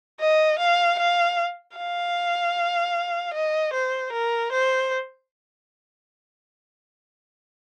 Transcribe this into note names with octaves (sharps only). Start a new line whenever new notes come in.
D#5
F5
F5
F5
D#5
C5
A#4
C5